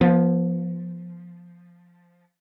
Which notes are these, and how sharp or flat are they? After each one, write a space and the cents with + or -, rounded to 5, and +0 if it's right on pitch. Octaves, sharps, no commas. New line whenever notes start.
F3 +0 B3 -30